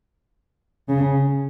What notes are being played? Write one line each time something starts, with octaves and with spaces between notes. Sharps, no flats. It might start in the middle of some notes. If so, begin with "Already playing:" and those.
C#3